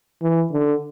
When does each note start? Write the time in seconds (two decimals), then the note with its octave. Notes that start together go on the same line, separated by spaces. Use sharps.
0.22 E3
0.52 D3